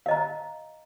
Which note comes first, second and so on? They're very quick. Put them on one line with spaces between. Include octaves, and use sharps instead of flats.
F5 D#5 A#5